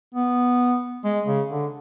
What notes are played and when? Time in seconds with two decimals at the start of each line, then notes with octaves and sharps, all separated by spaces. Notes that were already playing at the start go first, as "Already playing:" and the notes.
0.14 B3
1.05 G#3
1.27 C#3
1.50 D3